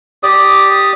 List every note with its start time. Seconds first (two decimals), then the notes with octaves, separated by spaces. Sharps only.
0.23 G4 D5 D#6